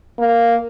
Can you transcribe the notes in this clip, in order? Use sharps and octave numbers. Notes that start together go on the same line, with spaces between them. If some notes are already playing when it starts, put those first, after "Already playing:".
A#3